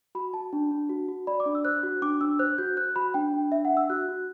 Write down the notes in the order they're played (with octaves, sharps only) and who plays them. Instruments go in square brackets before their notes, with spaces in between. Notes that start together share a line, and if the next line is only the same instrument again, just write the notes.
[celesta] F#4 B5
F#4 A5
D4
D4
F#4
F#4
D5 B5
D6
D4
E6
C5 F#6
F#4
D4 D6
D4 E6
C5 F#6
F#4 G6
C5 F#6
F#4 B5
D4 G5
D4
D4 E5
F#5
D4
E6
F#4 F#6
F#4